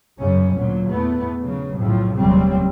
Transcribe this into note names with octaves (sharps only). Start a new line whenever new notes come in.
F#2 C#3 F#3 C#4
D2 A#2 F#3
E2 A3 B3
C#3 F#3
B1 F2 A2 C#3 F3 F#3
F1 D#2 C#3 F#3 G3 C4